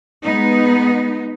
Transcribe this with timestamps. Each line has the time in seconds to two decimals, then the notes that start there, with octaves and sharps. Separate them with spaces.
0.23 G#3 B3 D#4